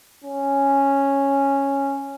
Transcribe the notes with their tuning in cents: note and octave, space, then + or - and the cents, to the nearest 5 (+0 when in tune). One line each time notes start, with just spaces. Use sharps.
C#4 -5